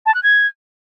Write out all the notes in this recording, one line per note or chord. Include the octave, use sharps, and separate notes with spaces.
A5
F#6
G#6